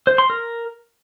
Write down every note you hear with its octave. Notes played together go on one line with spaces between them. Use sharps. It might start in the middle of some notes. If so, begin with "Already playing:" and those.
C5
C6
A#4